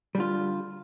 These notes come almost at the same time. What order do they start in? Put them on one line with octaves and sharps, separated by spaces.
G3 D3 F4